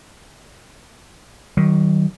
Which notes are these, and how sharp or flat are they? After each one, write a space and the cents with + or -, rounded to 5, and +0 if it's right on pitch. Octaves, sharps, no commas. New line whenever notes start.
D#3 +5 F#3 +40